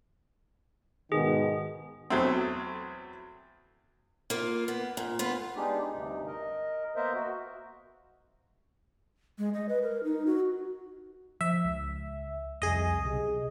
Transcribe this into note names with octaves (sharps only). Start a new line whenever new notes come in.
G#2 B2 D#3 G#4
E2 F#3 A3 C4
A#3 F4
B3
A#2
B3 F4
G#3 B3 D4 D#4 G4 G#4
D2 G2 C3 D#4
A#4 D#5
A#3 B3 A#4 C5 D#5 E5
F#4
G#3
D#5
B4
A#4
D#4
F#4
F3 E5
C#2
C2 F2 G#4 D#5
B1 C3